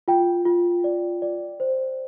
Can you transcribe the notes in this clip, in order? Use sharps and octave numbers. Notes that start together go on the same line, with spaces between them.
F4 G5
F4
D5
D5
C5